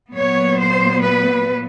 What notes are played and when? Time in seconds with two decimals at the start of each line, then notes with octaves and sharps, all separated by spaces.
0.13 A#2 F#3 B3 C#5
0.57 C5
1.02 B4